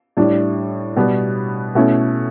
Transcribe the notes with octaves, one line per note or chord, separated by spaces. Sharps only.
A2 G3 D4
B2 G3 B3
B2 A3 C#4 E4